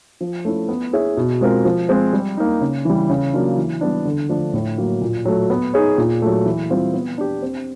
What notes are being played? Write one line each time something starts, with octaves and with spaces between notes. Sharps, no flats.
F3
A3 C#4 E4
B3
E4 G#4 C#5 E5
B2
G#3 C4 F4 A#4
F3
G#3 C4 F4
G3
A#3 D#4
C#3
E3 G3
C#3
F#3 A#3 D4 F4
E3
G3 B3 D4
D3
F3 A3 D4
A2
F#3 A#3
A#2
F#3 A3
B3
D#4 G#4 C#5
A#2
F#3 A3
E3
G3 C4 F4
B3
D4 G4
C4